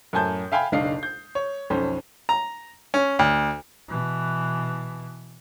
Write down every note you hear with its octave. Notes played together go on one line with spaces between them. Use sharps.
F#2 A2 G#5 A5 G6
E5 F5 G5 G#5 B5
F#1 B1 D4 D#5 F5 C7
G6
C#5
B1 F2 C#4 C5
A#5
C#4
D2
B2 E3